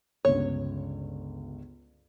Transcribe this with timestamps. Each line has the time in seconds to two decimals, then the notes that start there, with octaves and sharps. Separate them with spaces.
0.25 G1 C#2 C#5